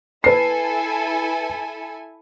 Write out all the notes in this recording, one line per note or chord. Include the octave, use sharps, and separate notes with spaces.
E4 A4 B4 G#5 C7